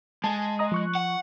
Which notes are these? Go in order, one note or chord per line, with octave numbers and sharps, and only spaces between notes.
G#3 A5
D#5 A#5 D#6
F3 C#6 F#6
F#5